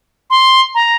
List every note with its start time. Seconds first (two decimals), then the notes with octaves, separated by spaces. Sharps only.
0.30 C6
0.75 A#5